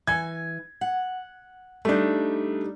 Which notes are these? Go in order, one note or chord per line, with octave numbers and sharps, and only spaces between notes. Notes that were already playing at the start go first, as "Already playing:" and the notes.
E3 G#5 G#6
F#5
G3 A3 D4 D#4